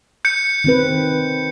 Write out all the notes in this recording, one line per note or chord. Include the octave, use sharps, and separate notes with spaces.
G6 C#7
D#3 C4 B4